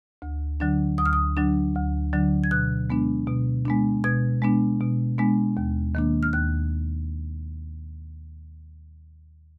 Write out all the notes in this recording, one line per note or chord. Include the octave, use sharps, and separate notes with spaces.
D2
D3 F#3 D4
D2 D#6
F6
D#6
D3 F#3 D4
D2
D3 F#3 D4
G#6
B2 F#6
G#3 B3 D4
B2
G#3 B3 D4
B2 G#6
G#3 B3 D4
B2
G#3 B3 D4
D#2
D#3 A#3 D4
F6
D#2 F#6